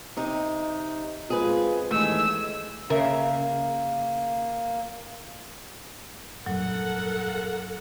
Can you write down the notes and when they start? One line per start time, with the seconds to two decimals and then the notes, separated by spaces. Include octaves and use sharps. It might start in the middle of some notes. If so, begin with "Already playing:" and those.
0.17 C3 D#4
1.30 G#3 C4 F4 G#4 B4
1.91 D#2 E3 G#3 A3 G#5 E6
2.90 C#3 A#3 A#4 E5
6.46 F1 G2 A#2 F#3 A4 A#4 F#5